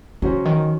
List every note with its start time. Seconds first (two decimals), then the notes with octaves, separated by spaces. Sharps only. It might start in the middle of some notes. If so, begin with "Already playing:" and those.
0.22 C#3 F#3 C#4 F#4 C5
0.45 D#3